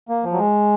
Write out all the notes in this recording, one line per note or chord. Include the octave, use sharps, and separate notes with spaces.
A#3
F3
F#3
G#3